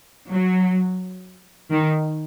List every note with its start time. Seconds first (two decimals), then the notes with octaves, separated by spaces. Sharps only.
0.28 F#3
1.71 D#3